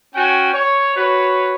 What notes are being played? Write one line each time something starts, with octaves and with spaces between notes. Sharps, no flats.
C#4 F#4 G5 G#5
C#5
F#4 B4 C#5